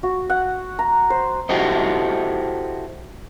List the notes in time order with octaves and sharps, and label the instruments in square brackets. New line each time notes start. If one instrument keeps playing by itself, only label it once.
[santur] F#4
F#5
A#5
C5
[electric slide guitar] E4 F#4 G4 A4 C5 D#5